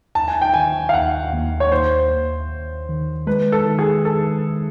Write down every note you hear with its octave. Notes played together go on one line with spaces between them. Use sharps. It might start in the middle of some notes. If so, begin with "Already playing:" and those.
D#2 A5
G#5
G5
D#3 G#5
F5
D#2 F#5
D#2
C#5
D#2 C5
D#2
D#2
D#3
G#3 B4
A4
D#3
G#4
D#3 A4
D#3